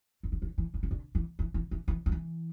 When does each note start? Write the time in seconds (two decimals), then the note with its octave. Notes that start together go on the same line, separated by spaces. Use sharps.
0.23 D3
0.32 D#3
0.42 E3
0.58 E3
0.74 E3
0.83 C#3
0.91 D3
1.15 E3
1.39 E3
1.54 E3
1.71 E3
1.88 E3
2.06 F3
2.12 E3